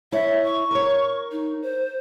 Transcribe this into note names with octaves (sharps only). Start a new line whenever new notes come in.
E4 C#5 E5
C#6
A#4 C#5
D#4
C5